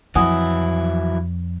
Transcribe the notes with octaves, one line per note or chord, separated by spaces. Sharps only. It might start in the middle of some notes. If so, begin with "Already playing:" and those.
F2 E3 F#3 E4 F#5 G#5 D#6